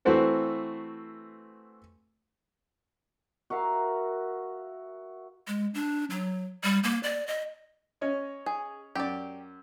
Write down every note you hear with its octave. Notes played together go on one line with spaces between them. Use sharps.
E3 A3 C4 F#4 A4 C5
F#4 A#4 E5 F5
G#3
D4
F#3
G3
A#3
D5
D#5
C#4 C#5 D#5
G#4
F#2 G4 D5